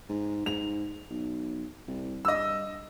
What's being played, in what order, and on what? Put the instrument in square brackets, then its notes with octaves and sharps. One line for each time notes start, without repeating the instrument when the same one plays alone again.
[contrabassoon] G#2
[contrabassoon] G#2 [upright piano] F7
[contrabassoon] B1
C2
[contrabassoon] G2 [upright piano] D#5 E6